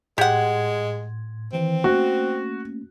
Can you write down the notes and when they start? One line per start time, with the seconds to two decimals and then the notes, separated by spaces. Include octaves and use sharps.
0.18 A2 G#3 G4 F#5 C6 G#6
1.53 D#3 E3 C4
1.84 A3 A#3 C#4 F#4